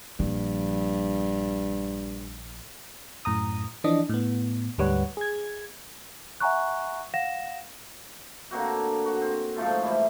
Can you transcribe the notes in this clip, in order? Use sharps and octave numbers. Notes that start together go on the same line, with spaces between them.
A#1 G2 F3
F#2 A2 A#5 D#6
E3 F3 D4 D#5
A2 B3
D2 G#2 G3 B4 C#5 F#5
G#4 G#6
E5 F#5 G#5 A#5 C#6 F#6
F5 F#5 A#6 E7
D3 A#3 C4 F#4
F#4
C4
G#2 F3 A3 F4
E3 G3